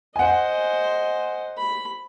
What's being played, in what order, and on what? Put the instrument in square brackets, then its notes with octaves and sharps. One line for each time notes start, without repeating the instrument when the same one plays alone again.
[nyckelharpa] C5 D#5 [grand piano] F#5 G#5
[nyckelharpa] B5